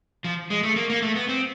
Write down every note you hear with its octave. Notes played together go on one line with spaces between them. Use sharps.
F3
G#3
A3
A#3
A#3
A3
B3
C4